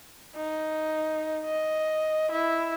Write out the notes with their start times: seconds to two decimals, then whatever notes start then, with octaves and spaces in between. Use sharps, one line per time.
0.36 D#4
1.45 D#5
2.31 E4